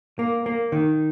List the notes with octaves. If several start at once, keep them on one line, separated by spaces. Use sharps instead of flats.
A#3
A#3
D#3